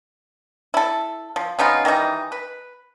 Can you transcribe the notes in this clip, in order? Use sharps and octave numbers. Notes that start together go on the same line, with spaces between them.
E4 A4
F3
C#3 B3 D#4 F4
D#3 E3 G3 D#4
B4